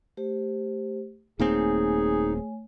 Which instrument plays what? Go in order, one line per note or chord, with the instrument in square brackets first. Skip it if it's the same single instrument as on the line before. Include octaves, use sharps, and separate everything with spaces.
[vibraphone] A3 G4 C5
[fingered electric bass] D#1 A#3 C4 [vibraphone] A3 C#5 G#5 [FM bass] D#4 [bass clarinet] G#4